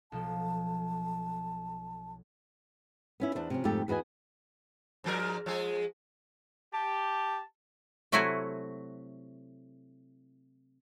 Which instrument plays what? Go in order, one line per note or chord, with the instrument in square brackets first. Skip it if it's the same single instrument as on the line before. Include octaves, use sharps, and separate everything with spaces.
[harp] B1 F3 A4 [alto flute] A5
[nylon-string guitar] B3 C#4 E4
E2 D4 C5
C3 F3 C#4
F2 G#2 C3 A3 G4 A4
E2 F#4 B4 D#5 G#5
[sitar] G#2 F3 A#4
F3 G#3 G#4
[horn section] G4 [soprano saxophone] A5
[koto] C3 F#3 A3 E4 F#4 G#5